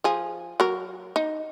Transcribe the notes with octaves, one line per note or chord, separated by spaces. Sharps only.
F3 G#4
F#3 A#4
D#4